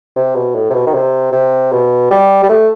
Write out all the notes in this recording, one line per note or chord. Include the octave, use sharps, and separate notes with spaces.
C3
B2
A2
C3
B2
D#3
C3
C3
B2
G3
G3
A3